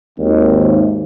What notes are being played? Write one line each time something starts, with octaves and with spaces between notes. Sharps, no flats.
G#1 D#2